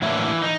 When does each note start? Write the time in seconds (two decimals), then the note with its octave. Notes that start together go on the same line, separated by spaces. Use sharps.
0.02 A2 E3 F#3 A#3 D4 E4
0.42 D#4